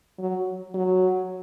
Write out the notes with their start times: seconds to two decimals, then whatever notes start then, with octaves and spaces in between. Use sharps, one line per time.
0.19 F#3
0.74 F#3